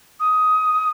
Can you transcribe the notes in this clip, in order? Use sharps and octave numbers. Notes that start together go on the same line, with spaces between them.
D#6